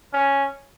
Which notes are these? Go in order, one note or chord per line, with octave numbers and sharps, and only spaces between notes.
C#4